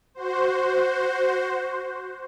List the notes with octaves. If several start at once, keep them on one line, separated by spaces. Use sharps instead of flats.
F#4 C5